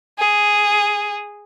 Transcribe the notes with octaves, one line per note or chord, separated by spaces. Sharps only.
G#4